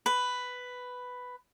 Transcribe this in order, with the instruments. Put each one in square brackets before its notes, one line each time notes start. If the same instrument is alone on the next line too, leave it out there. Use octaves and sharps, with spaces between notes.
[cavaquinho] B4